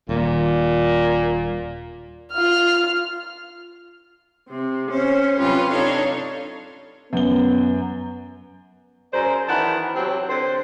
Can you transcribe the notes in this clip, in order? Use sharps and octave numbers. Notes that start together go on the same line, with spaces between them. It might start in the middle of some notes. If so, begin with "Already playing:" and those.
D#1 A#2
F4 F6
C3 C4
C#4 C5
C3 F#3 C#4 F4 G4 B4
D4 D#4 A4 C#5 F5
F#2 B3 G7
F#2 G#4 C5 D5 A#5
D#3 E3 F#5 A5 B5
C3 F#3 C4
D3 C4 C5